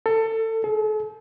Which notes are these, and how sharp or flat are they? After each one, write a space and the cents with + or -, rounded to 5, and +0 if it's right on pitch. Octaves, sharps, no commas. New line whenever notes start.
A4 +25
A4 -45